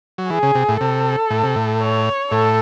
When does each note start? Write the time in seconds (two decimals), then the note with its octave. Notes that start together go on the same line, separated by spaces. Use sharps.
0.18 F#3
0.30 E3 G#4
0.43 C#3
0.55 C3
0.69 A2
0.81 C3 A4
1.30 A2
1.43 C3
1.56 A2
1.81 C#5
2.32 A2 A4